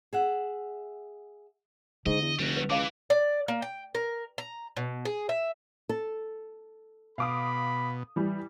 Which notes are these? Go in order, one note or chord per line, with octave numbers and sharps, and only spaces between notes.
G#4 E5 F#5
G#2 D3 D#5
E2
F1 G3 F#4
B4
C#2 E3 F5 A5 D6
D5
A#3
G5
A#4
A#5
B2
G#4
E5
A4
B2 F5 B5 D6 D#6
E3 G3